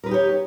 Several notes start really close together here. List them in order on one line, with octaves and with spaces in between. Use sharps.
A#4 B4 D#4 G4 C#5